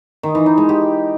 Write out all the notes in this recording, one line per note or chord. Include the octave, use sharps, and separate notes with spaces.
D#3
E3
D#4
G#3
G4